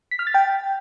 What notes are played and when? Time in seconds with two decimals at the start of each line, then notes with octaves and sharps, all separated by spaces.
0.11 B6
0.19 F6
0.27 A6
0.34 G5